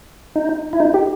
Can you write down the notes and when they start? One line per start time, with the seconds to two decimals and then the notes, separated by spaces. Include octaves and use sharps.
0.36 D#4
0.73 E4
0.80 D#4
0.94 G4